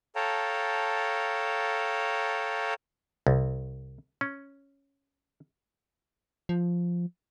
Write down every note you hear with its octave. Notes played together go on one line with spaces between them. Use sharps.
A4 C#5 F5 G5 A5 A#5
C2
C#4
F3